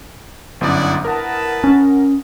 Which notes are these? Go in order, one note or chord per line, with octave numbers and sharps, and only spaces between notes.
G1 F#2 E4 D5 F#5 D#6
E4 A#4 B4 F#5 A5
C#4